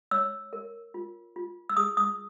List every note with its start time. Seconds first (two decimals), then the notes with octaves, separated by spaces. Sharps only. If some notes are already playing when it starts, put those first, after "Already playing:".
0.11 C#5 E6
0.53 A#4
0.94 F4
1.36 F4
1.69 E6
1.77 G#4 D#6
1.97 D#6